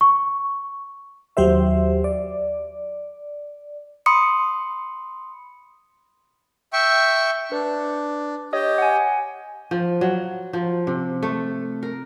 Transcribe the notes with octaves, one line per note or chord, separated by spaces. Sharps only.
C#6
D#2 F#3 G4 C5 E5
D5
B5 C6 D#6 C#7
E5 G5 C#6
D4 B4
G4 C#5 D#5 D#6
F#5 G#5
F3
F#3
F3
C3
A3
A#4